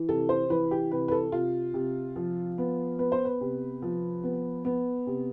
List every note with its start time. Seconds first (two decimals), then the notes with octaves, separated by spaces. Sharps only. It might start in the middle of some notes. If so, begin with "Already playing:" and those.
Already playing: E3
0.09 C3 A4
0.29 C5
0.50 E3 B4
0.71 G4
0.91 C3 B4
1.08 B4
1.12 A4
1.32 C3 F4
1.74 C3
2.16 F3
2.58 B3
2.98 B3 B4
3.12 C5
3.25 B4
3.41 C3
3.82 F3
4.24 B3
4.65 B3
5.07 C3